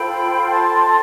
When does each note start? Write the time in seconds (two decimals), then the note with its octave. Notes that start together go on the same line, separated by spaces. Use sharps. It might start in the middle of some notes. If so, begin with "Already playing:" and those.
Already playing: F4 A4 C5 G5 B5
0.49 A5 C6